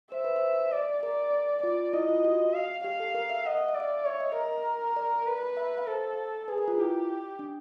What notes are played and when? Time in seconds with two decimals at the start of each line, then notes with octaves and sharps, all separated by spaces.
0.12 C5 E5
0.25 B4
0.36 C5
0.72 D5
1.03 A#4 D5
1.63 F4 D5
1.93 E4 D#5
2.09 F4
2.25 F#4
2.54 F5
2.84 G4 F5
3.00 A4
3.15 A#4
3.30 E5
3.45 D#5 F#5
3.57 F5
3.68 E5
3.75 D5 F5
4.05 C#5 E5
4.20 D#5
4.36 A#4
4.96 D5
5.27 B4
5.57 E5
5.78 F5
5.87 A4 C5
6.48 G#4 B4
6.58 A#4
6.68 F4
6.78 E4 G4
7.39 D4